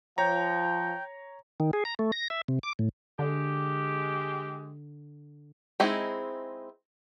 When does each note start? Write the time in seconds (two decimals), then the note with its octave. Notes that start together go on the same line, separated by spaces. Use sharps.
0.18 F3 C#5 G5 A#5
1.60 D#3
1.73 G#4
1.85 A#5
1.99 A3
2.12 A#6
2.30 E5
2.48 C3
2.63 D6
2.79 A2
3.19 D3 G#3 G4
5.80 G#3 C4 D#4 E4 G#4